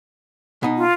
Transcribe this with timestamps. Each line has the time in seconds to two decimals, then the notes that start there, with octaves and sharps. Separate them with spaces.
0.63 B2 D#4
0.77 F4